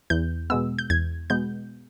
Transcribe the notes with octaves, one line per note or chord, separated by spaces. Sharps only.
E2 G6
B2 G#3 B3 E6
G6
E2 G#6
B2 G#3 B3 G6